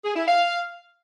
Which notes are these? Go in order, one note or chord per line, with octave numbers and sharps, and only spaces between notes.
G#4
E4
F5